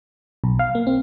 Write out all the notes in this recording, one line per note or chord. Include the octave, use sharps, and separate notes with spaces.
B1
F5
A#3
C4